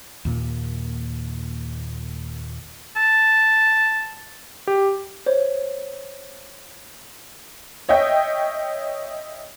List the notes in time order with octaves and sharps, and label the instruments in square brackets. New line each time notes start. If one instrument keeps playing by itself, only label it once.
[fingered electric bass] D#2 A#2 A#3
[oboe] A5
[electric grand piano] G4
[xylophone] C5 C#5
[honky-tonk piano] C#5 D#5 E5 G5